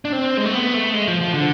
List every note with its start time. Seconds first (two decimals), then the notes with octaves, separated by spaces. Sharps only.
0.05 D4
0.13 C4
0.37 G#3
0.45 A3
0.53 B3
0.74 A3
0.94 G#3
1.08 F3
1.21 F3
1.34 D3